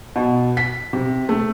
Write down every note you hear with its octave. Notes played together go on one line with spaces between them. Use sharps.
B2
B6
C3
A3